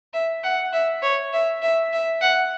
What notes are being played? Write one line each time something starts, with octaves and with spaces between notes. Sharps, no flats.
E5
F#5
E5
C#5
E5
E5
E5
F#5